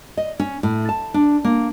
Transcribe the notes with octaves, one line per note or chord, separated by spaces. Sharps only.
D#5
C#4
A2
A5
D4
A#3